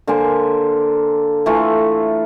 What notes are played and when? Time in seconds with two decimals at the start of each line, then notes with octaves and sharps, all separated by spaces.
0.07 D3 A#3 C5 G#5
1.46 E3 A3 F4